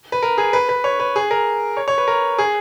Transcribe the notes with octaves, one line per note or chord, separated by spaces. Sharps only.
B4
A#4
G#4
B4
B4
C#5
B4
G#4
A#4
C#5
C#5
B4
A#4
G#4